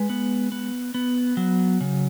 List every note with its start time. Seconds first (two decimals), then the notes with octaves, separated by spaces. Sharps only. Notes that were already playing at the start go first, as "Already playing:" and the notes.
Already playing: G#3 B4
0.10 B3
0.52 B3
0.94 B3
1.37 F#3
1.81 C#3